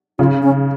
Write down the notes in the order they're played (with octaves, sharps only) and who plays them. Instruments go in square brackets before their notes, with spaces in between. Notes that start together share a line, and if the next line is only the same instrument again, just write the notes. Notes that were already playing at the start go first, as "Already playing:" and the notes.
[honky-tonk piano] C#3 [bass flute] F4
[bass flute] C#4